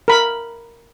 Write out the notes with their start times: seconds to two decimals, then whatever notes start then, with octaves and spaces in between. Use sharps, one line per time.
0.08 A#4 B5